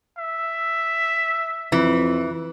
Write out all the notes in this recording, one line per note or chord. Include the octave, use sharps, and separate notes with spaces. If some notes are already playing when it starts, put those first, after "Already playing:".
E5
F2 E3